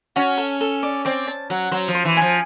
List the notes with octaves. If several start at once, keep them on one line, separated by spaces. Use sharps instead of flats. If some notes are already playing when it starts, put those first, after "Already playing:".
C#4 F#4
A4
A4
D5
C4 D5
A5
F#3 F#5
F#3 C5
F3
C5
E3
F3 G#5